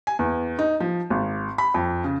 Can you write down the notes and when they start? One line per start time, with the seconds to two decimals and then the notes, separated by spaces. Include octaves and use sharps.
0.07 G#5
0.19 E2
0.59 D#4
0.80 F3
1.10 G#1
1.58 B5
1.74 F2
2.04 C#3